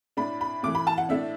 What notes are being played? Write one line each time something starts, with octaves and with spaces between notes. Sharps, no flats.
A2 A3 D4 B5
B5
A2 E3 A3 D6
B5
A5
F#5
A2 A3 D4 E5